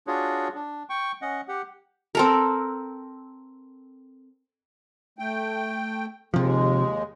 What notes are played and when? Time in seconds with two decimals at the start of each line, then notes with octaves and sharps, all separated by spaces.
0.07 D4 F4 F#4 G#4 C#5
0.55 D4
0.89 G5 C#6
1.22 C#4 D#5 F#5
1.48 G4 F#5
2.15 C4 A4 A#4
5.19 A3 G5
6.34 D#2 C3 F3 G#3